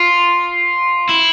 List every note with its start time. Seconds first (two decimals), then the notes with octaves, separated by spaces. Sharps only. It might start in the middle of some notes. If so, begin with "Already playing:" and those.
Already playing: F4
1.09 E4